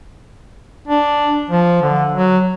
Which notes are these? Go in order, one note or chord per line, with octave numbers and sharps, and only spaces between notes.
D4
F3
D3
F#3